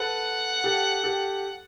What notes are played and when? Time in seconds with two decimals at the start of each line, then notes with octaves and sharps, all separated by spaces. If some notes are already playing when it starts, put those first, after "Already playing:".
Already playing: A4 B4 F#5
0.64 G4 A4
1.03 G4 A4